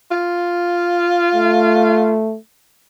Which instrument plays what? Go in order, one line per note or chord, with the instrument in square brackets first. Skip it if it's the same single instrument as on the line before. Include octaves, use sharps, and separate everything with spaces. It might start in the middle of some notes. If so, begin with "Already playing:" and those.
[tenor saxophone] F4
[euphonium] A3